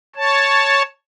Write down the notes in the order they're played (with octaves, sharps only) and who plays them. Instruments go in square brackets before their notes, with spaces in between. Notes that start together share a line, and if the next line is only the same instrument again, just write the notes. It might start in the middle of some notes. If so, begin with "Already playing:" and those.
[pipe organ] C#5 A5